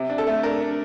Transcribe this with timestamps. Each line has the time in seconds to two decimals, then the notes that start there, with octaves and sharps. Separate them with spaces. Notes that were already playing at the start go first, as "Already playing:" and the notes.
Already playing: C3
0.10 D4
0.18 A4
0.27 A3
0.43 D4 A#4
0.61 D4